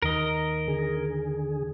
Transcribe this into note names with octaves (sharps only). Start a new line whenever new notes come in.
D#2 D#3 A#4 D#5
D3 G#4